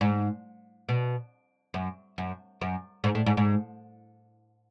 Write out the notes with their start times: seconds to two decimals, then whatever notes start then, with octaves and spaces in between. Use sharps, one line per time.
0.01 G#2
0.89 B2
1.74 F#2
2.18 F#2
2.61 F#2
3.04 G#2
3.15 A2
3.26 G#2
3.37 G#2